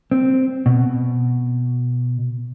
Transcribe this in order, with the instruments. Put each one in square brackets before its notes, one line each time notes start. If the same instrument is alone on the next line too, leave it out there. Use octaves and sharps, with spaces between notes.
[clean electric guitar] C4
B2